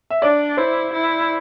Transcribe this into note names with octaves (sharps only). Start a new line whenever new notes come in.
E5
D4 D5
E4 C5
E4